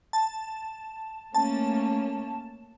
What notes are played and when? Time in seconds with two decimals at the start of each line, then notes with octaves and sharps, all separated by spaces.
0.13 A5
1.35 A3 A#3 C#4 A5